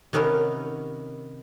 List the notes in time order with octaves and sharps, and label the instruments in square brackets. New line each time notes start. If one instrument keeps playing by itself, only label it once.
[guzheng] C3 D#3 B3 C#4 A#4